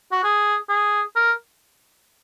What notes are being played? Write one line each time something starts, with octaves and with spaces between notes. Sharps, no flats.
F#4
G#4
G#4
A#4